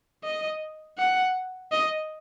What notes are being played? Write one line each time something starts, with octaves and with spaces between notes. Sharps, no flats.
D#5
F#5
D#5